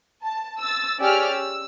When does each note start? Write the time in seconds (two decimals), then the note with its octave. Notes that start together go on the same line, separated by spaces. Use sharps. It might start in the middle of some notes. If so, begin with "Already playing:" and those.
0.24 A5
0.60 E6 A6
1.00 C#4 G4 G#4 D5 E6 F6
1.29 E6